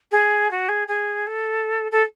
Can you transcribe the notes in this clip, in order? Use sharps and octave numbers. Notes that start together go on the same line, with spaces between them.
G#4
F#4
G#4
G#4
A4
A4